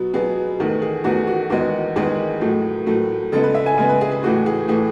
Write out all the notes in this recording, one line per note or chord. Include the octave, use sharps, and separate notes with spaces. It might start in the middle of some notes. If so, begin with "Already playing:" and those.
Already playing: B2 F#3 B3
B2 F#3 B3 G#4
E2 D#3 A3
G#4
E2 D#3 A3 F#4
F#4
E2 D#3 G#3 B3 F#4
E2 D#3 G#3 B3 G#4
A2 F#3 A3
A2 F#3 A3
C#3 G#3 B3 A4
B4
E5
G#5
C#3 G#3 B3 G#5
B4
G#4
G#4
A2 E3 A3 F#4
G#4
A2 E3 A3 G#4